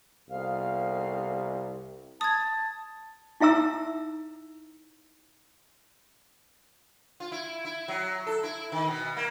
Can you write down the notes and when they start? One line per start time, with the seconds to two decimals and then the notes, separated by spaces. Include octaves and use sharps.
0.30 C2 F2 B3 F5
2.21 A5 D#6 G#6
3.41 D#4 E4 E5 A#5 E6
7.20 F4
7.32 E4
7.65 E4
7.88 F#3
8.27 A4
8.43 E4
8.72 D#3
8.88 B2
9.17 A#3